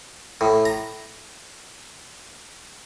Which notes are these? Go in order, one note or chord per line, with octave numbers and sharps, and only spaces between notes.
A2
A#5